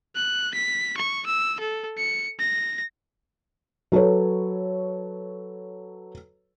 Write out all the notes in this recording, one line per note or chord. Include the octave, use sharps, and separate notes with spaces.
F#6
B6
C#6
E6
A4
C#7
A#6
F#3 A4 B4 C#5